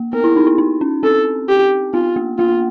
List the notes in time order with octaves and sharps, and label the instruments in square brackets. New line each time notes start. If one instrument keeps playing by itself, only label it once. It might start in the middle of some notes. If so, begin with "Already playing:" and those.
Already playing: [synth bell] A#3
[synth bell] B3 [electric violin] A#4
[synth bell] E4
D#4
E4
D#4
C#4
[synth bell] C4 [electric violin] A4
[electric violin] G4
[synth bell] B3 [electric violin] F4
[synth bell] A#3
[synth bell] A#3 [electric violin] F4